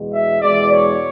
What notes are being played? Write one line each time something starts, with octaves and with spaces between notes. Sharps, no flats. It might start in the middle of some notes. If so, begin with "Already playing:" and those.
Already playing: E2 B2 G#3
E5
E2 B2 G#3 D5
C#5